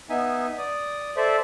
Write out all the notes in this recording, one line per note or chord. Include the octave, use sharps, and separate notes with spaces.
B3 D#4 E5 G#5
D5 D#6
A4 C5 D5 E5